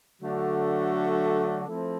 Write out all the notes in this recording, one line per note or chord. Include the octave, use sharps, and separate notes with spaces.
D3 F#3 A3 D4 F#4
F3 A3 C4 E4 A4